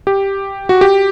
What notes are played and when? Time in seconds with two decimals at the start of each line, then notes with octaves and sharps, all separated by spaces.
0.07 G4
0.69 F#4
0.81 G4